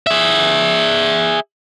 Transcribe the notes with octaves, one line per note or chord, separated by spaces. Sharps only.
G#4 E5